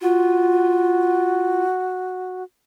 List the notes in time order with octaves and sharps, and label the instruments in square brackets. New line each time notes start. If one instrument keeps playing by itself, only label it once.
[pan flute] F4 [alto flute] F#4